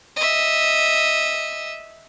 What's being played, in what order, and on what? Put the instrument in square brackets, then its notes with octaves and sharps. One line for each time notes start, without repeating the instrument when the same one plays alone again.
[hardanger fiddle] D#5 E5